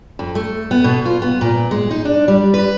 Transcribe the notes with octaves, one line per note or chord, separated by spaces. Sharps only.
F2
A3
B3
B2
F4
B3
A#2
G#3
D#4
D4
G3
B4